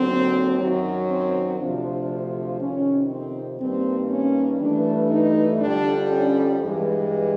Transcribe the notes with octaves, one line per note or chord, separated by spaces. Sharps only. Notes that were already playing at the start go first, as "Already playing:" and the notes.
Already playing: D#2 D3 F#3 C4
F#2 D#3 F#3
C4
D2 C3 F3 D4
F2 C3 D#3 C#4
C4
G2 D#3 G3 A#3 C4
C#4
G2 E3 A3 D4
D#4
F2 D3 G3 D4
C#4
G2 E3 G#3